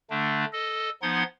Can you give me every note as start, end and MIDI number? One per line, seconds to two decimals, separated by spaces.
0.10 0.45 50
0.10 0.45 57
0.10 0.45 62
0.53 0.90 69
0.53 0.90 75
1.02 1.23 53
1.02 1.23 59
1.02 1.23 63
1.02 1.23 78
1.02 1.23 84
1.02 1.23 92